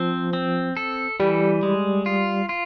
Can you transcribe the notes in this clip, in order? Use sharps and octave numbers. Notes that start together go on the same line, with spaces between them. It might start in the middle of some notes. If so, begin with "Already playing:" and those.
Already playing: F3 C4
C4
A4
E3 G3
G#3
F4
F4